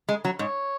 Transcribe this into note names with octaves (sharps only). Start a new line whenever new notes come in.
G#3
F#3
G#2 C#5